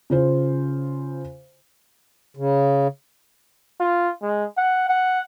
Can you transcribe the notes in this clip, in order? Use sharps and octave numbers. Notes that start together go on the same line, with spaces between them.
C#3 F4 C5
C#3
F4
G#3
F#5
F#5